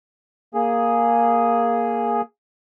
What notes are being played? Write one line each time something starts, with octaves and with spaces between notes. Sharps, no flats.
A#3 G#4